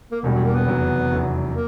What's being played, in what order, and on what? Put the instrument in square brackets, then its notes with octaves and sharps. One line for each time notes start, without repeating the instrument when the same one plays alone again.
[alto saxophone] A#3
[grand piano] E1 E2 B2 G3
[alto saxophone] F#3
A#3
B3
[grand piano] F1 E2 C#3 F#3
F1 E2 C#3 F#3
[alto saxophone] A#3